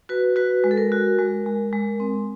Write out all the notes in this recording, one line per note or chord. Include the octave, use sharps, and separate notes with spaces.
F#4 B4
F#4 B4
G#3
A4
A#4
F#4
G#3
G#3
G#3
C4